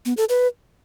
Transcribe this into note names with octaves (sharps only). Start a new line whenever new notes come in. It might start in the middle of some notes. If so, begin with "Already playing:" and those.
B3
A4
B4